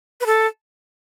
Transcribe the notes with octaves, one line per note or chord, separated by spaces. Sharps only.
B4
A4